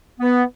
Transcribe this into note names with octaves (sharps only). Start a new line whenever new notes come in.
B3